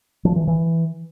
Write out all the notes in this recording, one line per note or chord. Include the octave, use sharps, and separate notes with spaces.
F3
E3
E3